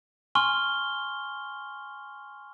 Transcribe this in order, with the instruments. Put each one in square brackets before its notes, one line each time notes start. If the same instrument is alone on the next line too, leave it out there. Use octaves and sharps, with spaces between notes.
[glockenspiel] G#5 C6 C#6 F6 G7